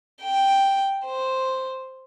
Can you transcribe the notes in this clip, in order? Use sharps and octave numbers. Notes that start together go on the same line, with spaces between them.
G5
C5